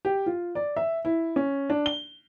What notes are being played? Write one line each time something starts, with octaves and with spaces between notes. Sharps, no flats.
G4
F4
D5
E5
E4
C#4
D4
G7